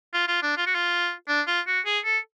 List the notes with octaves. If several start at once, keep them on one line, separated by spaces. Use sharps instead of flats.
F4
F4
D4
F4
F#4
F4
D4
F4
F#4
G#4
A4